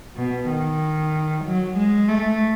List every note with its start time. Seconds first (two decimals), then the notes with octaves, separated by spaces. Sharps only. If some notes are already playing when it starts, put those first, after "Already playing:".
0.17 B2
0.49 D#3
1.45 F#3
1.77 G#3
2.09 A3